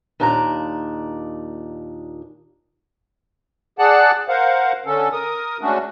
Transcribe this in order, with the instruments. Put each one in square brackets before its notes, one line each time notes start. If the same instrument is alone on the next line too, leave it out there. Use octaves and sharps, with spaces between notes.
[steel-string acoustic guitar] D#2 A#2 D4 D#4 A4 A#5
[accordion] G#4 D5 F#5 A5 F#6
A#4 C5 F5 F#5
D3 C#4 A4
A#4 D#6
G#3 A3 C#4 D4 F#4